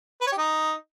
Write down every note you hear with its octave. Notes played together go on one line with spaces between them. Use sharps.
B4
C#5
G4
D#4